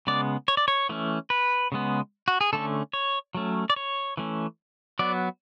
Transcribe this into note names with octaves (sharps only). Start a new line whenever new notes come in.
C#3 G#3 B3 D5
C#5
D5
C#5
E3 A3 C#4
B4
C#3 G#3 B3
F#4
G#4
D3 A3 C#4 A4
C#5
F#3 A3 C#4
D5
C#5
E3 A3 C#4
F#3 B3 D5